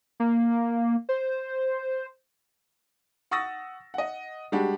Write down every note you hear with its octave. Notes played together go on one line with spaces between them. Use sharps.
A#3
C5
F#5 C#6 D#6 E6 A6 A#6
D#5 F#5
G3 G#3 D4 F#4 G4